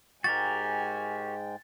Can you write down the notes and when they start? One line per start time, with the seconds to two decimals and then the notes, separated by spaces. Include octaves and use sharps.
0.24 G#2 G#3 F#4 G4 A#4 G5 G#5 A6